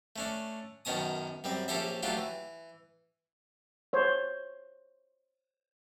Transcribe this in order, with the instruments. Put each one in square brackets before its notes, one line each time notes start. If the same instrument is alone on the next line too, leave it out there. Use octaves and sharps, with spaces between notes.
[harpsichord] A3 C#4 D4
F#2 B2 D#3 C#4 A5 D#6
F#2 G3 C4
A#1 C#4 G4 A4 C5 E5
F#3 A3 D4 F4 G4
E3
[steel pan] C5 C#5